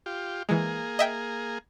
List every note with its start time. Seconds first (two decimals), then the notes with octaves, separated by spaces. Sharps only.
0.06 F4 G4
0.49 E3 G#3 A#3 G#4
0.99 D#5 E5 G5